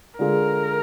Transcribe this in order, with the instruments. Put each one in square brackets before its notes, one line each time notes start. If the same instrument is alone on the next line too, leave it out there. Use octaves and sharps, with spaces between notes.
[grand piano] D3 G#3 D4 F4 G#4 [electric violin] A#4